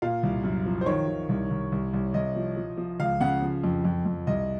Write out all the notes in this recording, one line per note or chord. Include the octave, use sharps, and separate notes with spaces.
A#2 F5
C2
F#2
F3
C5
D#3 C#5
D#3
C2
C2
C2
C2
C2 D#5
F3
F3
F3
C#2 F5
C#3 F#5
F3
F2
F2
F2
C2 D#5